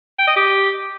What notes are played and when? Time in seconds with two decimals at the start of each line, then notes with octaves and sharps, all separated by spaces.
0.19 G5
0.27 D#5
0.36 G4